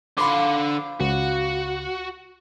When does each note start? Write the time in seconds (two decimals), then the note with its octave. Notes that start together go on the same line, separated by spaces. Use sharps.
0.18 D3 F3 A#3 B5 C6 D6
1.00 C#2 F#4